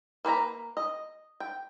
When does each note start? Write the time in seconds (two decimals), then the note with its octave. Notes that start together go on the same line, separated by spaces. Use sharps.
0.25 A#3 B4 C5 A#5
0.77 D#5
1.40 G5